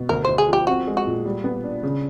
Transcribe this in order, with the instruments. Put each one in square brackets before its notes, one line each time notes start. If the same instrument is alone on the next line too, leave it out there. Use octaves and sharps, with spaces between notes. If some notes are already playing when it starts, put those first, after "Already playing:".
Already playing: [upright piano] B2
[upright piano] D2 [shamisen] A#4
[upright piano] D2 [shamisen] C5
[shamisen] G#4
[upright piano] F3 [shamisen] G4
[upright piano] C4 [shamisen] F#4
[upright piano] G#3
[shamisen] F#4
[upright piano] A#2
G3
B3
D4
C#3